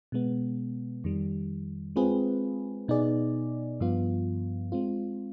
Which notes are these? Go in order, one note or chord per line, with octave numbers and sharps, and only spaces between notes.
B2 G#3 B3
F2 D#3 G3
G#3 C4 F4 G#4 B4
B2 B3 D#4 G#4 D5
G2 F3 B3 F4
G#3 C4 F4